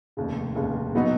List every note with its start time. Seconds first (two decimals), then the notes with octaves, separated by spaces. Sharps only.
0.17 F1 D#2 C#3
0.55 F1 D#2 C#3
0.94 B2 F#3 B3 D#4 F#4